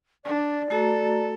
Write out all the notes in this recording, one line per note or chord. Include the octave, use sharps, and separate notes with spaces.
D4 D5
A3 F#4 A4 A#5